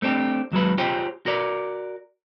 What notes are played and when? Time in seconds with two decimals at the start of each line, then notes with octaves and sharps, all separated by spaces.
0.02 A3 C4 D4 G4
0.52 D#2 F#3 G#3 B4
0.78 F4 G4 G#4 C5 C#5 G5
1.26 F#4 A#4 D5